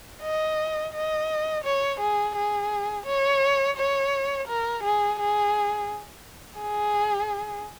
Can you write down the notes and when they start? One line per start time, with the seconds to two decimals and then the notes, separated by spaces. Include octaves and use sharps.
0.22 D#5
0.94 D#5
1.64 C#5
2.00 G#4
2.36 G#4
3.06 C#5
3.77 C#5
4.48 A#4
4.84 G#4
5.20 G#4
6.61 G#4